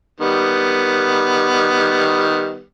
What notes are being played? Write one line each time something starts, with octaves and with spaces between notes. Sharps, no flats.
D#3 G3 B3